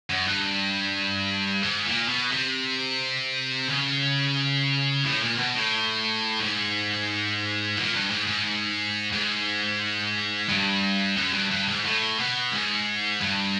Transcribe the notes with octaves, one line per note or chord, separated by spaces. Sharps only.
F#2
G2
G#2
A#2
B2
C3
C#3
A2
A#2
B2
A2
G#2
A#2
G2
G#2
G#2
G#2
G2
F#2
G2
G2
G#2
A2
B2
G#2
G2